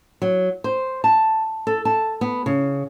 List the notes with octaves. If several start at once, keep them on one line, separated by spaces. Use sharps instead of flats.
F#3
C5
A5
A4
A5
B3
C#3